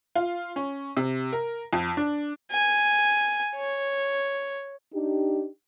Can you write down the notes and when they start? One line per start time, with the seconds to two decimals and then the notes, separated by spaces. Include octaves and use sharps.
0.16 F4
0.56 C#4
0.97 C3
1.32 A#4
1.73 F2
1.97 D4
2.52 G#5
3.55 C#5
4.93 D4 D#4 G4